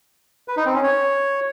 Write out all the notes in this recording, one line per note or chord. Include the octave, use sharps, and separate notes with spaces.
B4
D#4
C4
C#4
C#5